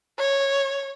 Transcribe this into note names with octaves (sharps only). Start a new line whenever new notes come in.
C#5